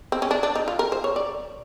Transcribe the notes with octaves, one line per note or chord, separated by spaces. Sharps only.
C4
C#4
D4
D4
D#4
F4
A#4
C5
C#5
D5